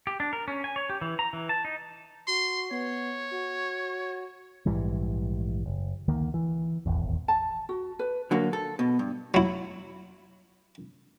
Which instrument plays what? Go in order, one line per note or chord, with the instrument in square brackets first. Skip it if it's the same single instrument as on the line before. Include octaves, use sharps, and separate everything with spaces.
[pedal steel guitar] G4
D4
A#4
C#4
G#5
C#5
G4
E3
A#5
E3
A5
D#4
[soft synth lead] F#4 [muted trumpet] C6
[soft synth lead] B3 [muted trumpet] C#5
[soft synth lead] F#4
[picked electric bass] A#1 G#2 E3 G3
F#1
D2 D#3 A#3
E3
D#1 G#1 E2
[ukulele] A5
F#4
B4
[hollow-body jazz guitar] D3 F#3 A#3
A4
B2
G2
[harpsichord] F#3 E4